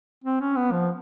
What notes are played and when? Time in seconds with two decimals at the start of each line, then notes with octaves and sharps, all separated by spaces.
0.24 C4
0.40 C#4
0.56 B3
0.72 F3